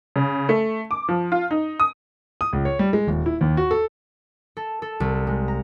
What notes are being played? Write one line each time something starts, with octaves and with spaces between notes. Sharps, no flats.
C#3
A3
D6
F3
F4
D#4
D#6
D#6
C#2
C#5
G3
G#3
D#1
E4
D#2
F#4
A4
A4
A4
C2
G#3
A#5